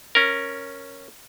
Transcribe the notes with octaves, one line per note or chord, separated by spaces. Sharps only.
C#4 A#4